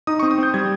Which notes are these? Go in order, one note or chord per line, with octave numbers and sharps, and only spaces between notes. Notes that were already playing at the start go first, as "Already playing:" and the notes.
D#4 D#6
C#6
C4
D#6
C4 G6
G3 G#6